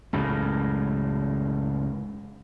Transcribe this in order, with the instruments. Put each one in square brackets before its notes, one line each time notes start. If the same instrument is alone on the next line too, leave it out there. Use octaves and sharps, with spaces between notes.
[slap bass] C#2 F#2 A2